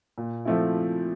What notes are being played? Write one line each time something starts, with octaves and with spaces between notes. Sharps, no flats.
A#2
F3 A3 C4 E4